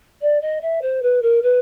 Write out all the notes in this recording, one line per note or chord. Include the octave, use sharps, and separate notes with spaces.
D5
D#5
E5
C5
B4
A#4
B4